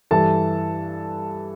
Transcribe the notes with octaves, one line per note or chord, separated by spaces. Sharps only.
G2 E3 A4 A5